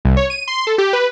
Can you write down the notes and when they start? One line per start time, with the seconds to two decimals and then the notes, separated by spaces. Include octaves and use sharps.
0.05 C2
0.17 C#5
0.30 D#7
0.48 C6
0.67 A4
0.78 G4
0.93 B4